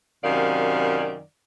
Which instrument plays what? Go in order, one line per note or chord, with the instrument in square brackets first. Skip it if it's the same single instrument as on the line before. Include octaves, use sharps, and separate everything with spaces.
[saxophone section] F#2 C3 D#3 D5 F5